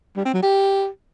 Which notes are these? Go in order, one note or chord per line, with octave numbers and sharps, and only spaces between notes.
G3
C4
F#3
G4